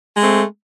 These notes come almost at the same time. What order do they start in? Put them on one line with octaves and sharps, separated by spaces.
G#3 A3 C4